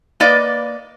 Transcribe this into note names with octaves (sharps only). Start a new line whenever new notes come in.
A#3 B4 D5 D#5